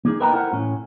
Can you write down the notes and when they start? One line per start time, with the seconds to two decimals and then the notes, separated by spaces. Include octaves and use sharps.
0.05 A#3 D#4 G#4
0.20 A#4 B4 D#5 G5 A5 A#5
0.32 E4 A4 A#4 C5 F#5
0.53 A2 C#4